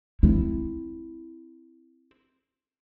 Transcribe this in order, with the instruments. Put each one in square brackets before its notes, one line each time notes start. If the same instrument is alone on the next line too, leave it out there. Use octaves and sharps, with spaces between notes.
[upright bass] C4 E4